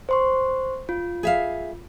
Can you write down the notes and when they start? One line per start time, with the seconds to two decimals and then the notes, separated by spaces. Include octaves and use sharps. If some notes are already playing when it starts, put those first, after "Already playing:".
0.09 C5 C6 C#6
0.89 F4
1.23 G#4 E5 F5